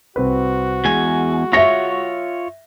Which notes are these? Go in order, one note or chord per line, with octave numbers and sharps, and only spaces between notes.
C2 C4 F#4 B4
E2 G#3 G#5
F4 C#5 E5 A#6